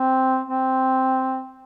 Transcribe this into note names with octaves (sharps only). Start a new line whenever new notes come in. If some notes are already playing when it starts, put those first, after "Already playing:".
Already playing: C4
C4